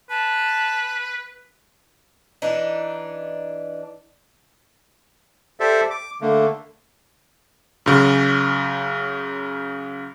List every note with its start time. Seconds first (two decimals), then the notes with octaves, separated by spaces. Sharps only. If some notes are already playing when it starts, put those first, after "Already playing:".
0.10 B4 A5
2.42 E3 D4 D#4
5.60 G4 A4 C5 D5 E5
5.91 D6
6.21 D3 A3 A#3
7.86 F#2 C#3